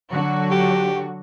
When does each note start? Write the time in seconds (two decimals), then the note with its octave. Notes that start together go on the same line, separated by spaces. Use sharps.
0.11 D3 F#3 F#4
0.51 G4